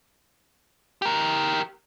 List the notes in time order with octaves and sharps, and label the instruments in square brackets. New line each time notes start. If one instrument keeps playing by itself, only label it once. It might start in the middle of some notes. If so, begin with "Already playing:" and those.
[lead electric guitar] G4 A#4